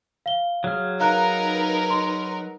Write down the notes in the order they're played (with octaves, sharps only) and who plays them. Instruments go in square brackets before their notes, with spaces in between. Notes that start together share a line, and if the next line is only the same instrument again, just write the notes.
[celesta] F5 G7
[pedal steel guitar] F#3 G#4 F6
[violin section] D#4 A#4 B4 [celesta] F5 A#5 F#6
[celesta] C6